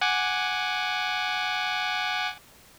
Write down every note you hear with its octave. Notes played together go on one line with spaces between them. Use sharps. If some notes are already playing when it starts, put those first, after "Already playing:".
F#5 G#5 D6